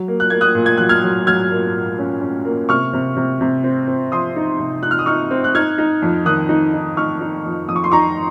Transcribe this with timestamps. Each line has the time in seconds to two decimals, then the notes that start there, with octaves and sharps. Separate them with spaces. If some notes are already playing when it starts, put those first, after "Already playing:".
Already playing: F#3
0.08 A#3
0.20 F#6
0.30 A#3 G#6
0.41 D#6 F#6
0.55 A#2
0.66 G#6
0.77 F#3 F#6
0.89 F6 G#6
1.03 F#3
1.26 F#3 F6 G#6
1.51 A#3
1.74 A#2
1.99 C#4
2.21 C#4
2.45 A#3
2.69 C3 C#6 F6
2.93 C3
3.17 C3
3.41 C3
3.64 C4
3.88 C4
4.12 F3 C6 D#6
4.36 D#4
4.60 C3
4.83 D#4 F#6
4.91 F6
4.99 D#6
5.06 D#4 C#6 F6
5.31 C4
5.44 F#6
5.55 D#4 F6 G#6
5.78 D#4
6.02 F2
6.25 D#3 D#6 F#6
6.49 D#4
6.73 D#4
6.97 D#4 C#6 F6
7.21 D#4
7.45 F2
7.68 F2 D#6
7.76 C#6
7.84 C6
7.92 D#4 A#5 C#6